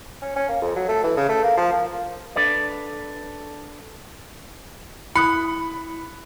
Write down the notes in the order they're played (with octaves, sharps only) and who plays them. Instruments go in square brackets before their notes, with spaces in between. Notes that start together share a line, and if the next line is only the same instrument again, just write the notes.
[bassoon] C#4
C#4
A#3
F2
F#3
A3
E3
C#3
A3
A#3
F3
A#3
[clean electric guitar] D4 A4 B4 D5
[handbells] E4 [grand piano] B5 [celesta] D#6 F#6 C#7